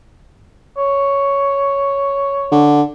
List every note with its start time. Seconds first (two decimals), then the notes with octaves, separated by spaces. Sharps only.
0.77 C#5
2.52 D3